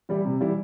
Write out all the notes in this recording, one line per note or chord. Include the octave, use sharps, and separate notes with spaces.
E3 G3 E4
C3
E3 G3 E4